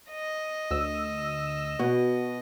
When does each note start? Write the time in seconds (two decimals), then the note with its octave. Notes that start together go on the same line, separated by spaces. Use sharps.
0.11 D#5
0.71 D2 E6
1.79 B2 F#4